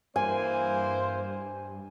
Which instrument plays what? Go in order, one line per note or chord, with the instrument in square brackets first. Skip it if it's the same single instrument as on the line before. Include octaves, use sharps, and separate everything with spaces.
[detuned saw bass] G2 [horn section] E3 A#3 [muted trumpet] C5 [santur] G#5